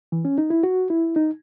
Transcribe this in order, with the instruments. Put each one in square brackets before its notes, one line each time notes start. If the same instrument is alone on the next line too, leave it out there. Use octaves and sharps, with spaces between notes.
[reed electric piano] E3
C#4
D#4
E4
F#4
E4
D#4